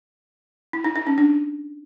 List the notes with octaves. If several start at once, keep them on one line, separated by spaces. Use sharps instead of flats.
E4
D#4
D#4
C#4
D4